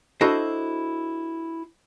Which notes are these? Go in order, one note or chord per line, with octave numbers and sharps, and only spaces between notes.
D4 E4 F#4 A4 C5 D#5